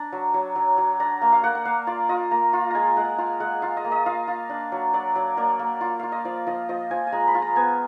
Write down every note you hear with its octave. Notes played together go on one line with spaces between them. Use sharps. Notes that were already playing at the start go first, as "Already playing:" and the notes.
Already playing: D4 A#5
F#3
F#3
F#3
F#3
D4 A#5
A#3
F5
A#3 F#5
F#5
A#3 F5
F4 D5
F4 D#5
A#3 A#5
F4
G#3 G#5 A#5
G#3 F#5
F4 F5
G#3 F#5
F4 F5
D#5
A#3
D#5
F4 F5
F4
D4
F#3
F#3 D5
F#3
A#3 D5
A#3
F4
F4 F5
D#5
F3 D5
F3 D#5
F3 D#5
F3 G#5
G#5
G#3 A#5
B5
F4
A#5
B3 G#5